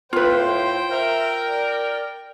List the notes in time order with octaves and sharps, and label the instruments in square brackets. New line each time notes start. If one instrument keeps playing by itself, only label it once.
[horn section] A2 [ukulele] F4 B4 [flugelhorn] C5 [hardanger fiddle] G5
[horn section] A#4 [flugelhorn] E5
[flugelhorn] D5